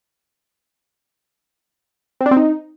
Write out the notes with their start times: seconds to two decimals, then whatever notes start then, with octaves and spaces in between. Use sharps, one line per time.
2.21 C4
2.26 D4
2.31 C4
2.37 D#4